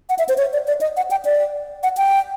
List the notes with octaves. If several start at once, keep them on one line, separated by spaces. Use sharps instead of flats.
F#5
E5
C5
C#5
D5
D5
D#5
F#5
G5
D5
F#5
G5